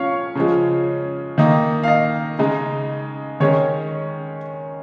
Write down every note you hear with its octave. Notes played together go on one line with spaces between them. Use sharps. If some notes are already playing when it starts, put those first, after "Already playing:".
Already playing: F3 C#4 C#5 F5 C#6
C#3 F3 G#3
D#3 A#3 D#4
F5
D#5
C#3 G#3 D#4
D#3 G#3 C#4 C#5